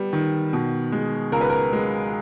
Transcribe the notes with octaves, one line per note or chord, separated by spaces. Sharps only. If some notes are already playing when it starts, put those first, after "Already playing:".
Already playing: G3 B3
D#3
B2
G#3
C#2 A#4
B4
A#4
G#3